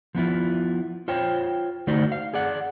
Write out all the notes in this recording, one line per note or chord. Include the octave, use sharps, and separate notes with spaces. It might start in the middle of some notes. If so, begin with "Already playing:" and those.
F3 B3 E4 F4
F4 C5 C#5 G5
D3 A3 D#4 F#4 C5 D5
F5
G#4 D5 F#5